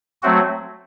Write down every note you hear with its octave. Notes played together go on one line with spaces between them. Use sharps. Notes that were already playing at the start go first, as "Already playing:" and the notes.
F#3 A3 C4 F#4